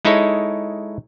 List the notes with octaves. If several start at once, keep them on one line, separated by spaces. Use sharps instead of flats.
G#3 D#4 E4 A4 C#5